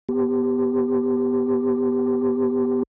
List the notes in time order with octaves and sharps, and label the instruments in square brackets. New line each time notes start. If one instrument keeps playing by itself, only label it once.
[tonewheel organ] B3 G4